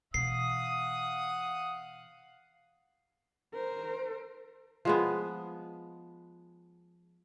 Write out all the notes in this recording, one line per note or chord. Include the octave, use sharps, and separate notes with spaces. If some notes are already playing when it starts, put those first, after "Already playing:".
B2 E3 F5 F#5 D#6 C7
A#4 C5
F3 G#3 B3